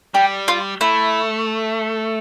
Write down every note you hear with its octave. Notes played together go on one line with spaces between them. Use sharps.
G3 G4
F4
A3 E4